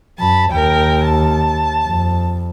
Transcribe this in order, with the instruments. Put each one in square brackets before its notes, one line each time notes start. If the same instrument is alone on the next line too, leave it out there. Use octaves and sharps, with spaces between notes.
[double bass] F#2 [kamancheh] A5 B5
[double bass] D#2 [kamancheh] A#4 G5
[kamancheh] A5
[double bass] F2